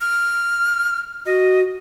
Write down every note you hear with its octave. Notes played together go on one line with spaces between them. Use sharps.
F6
F#4 D#5